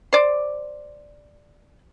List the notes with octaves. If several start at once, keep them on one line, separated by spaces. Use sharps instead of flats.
C5 D5